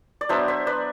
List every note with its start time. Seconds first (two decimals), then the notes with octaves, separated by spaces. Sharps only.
0.21 D5
0.29 F#3 B3 D4 C5 E5
0.48 C5 E5
0.67 B4 D5